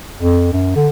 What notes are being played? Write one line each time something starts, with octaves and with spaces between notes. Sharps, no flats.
F2
F#2
D3